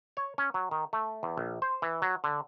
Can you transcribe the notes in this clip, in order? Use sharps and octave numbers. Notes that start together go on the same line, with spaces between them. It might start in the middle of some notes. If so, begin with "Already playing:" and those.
C#5
C#4
F#3
D#3
A3
E2
A#1
C5
E3
F#3
D3